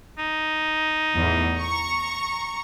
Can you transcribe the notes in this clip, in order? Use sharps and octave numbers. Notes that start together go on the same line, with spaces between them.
D#4
E2 A2
A#5 C#6